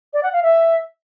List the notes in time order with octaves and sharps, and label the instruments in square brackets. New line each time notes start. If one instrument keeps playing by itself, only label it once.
[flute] D5
F#5
F5
E5